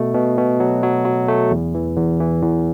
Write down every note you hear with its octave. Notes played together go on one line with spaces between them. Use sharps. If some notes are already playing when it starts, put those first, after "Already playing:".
Already playing: B2 A3
B2
B2
F#3
F#3
F#3
A3
E2
E3
E2
E3
E2